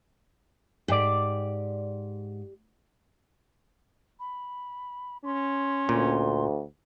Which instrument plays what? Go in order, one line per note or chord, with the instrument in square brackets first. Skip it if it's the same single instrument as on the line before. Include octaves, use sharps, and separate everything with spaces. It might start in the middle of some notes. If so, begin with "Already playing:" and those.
[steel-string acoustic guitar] G#2 [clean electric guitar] G4 D5
[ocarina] B5
[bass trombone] C#4 [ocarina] C6
[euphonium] D2 [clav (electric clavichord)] A#2